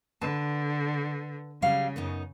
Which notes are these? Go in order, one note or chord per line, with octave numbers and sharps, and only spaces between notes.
D3 B4 A5
C#3 F#3 G3 F5
F#2 B3 D#4